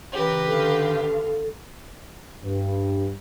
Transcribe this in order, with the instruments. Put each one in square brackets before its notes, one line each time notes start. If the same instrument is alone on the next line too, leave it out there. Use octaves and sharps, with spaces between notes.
[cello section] C#3 E3 A#4 [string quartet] G4 B4
[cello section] D3 D#3 F5 [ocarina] A4
[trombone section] G2